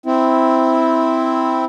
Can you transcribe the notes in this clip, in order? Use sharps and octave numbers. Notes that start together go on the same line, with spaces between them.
C4 E4